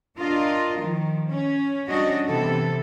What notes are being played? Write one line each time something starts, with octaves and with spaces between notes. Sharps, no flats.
D4 F4 A#4 D#5
D#3 F3
C#4
G3 C#4 D4 F#4 D#5
C3 E3 B3 A4